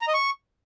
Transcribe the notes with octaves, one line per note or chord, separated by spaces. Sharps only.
A#5
D#5
C#6